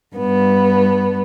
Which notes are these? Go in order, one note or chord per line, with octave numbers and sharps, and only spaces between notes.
G2 B3